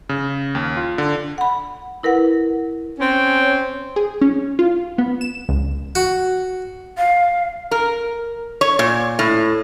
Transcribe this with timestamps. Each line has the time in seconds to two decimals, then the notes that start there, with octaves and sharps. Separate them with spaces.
0.09 C#3
0.55 D#2
0.77 F4
0.98 D3
1.38 F#5 B5
2.03 E4 A#4 B4 F#5
2.99 C4 C#4
3.96 G#4
4.21 C#4
4.59 F4
4.98 B3
5.21 E7
5.49 C#2
5.95 F#4
6.98 F5
7.71 A#4
8.61 C#5
8.79 A#2
9.19 A2